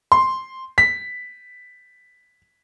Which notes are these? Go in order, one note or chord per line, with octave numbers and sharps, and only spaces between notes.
C6
B6